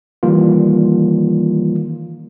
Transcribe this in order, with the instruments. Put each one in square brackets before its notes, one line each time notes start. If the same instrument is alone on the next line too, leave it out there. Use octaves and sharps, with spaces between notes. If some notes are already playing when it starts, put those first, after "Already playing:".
[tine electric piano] D#3 E3 G3 A#3 F4